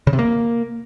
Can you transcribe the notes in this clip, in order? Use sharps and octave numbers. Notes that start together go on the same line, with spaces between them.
C#3
C3
A#3